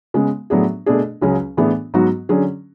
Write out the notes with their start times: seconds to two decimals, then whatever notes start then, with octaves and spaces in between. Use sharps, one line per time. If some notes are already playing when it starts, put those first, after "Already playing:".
0.14 C#3 G#3 B3
0.50 A2 F#3 B3 D4 G#4
0.86 B2 A3 D4 G#4
1.21 C#2 C#3 F#3 C#4 G#4
1.57 A2 E3 B3 D4 G#4
1.94 G#2 F#3 B3 F#4
2.29 D3 F#3 C#4 G#4